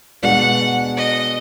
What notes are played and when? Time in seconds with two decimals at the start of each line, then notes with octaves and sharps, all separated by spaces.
0.22 B2 G#3 B3 D4 F#5
0.97 D#5